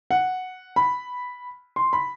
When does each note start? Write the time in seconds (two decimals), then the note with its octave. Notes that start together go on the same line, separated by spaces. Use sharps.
0.11 F#5
0.76 B5
1.76 C6
1.93 B5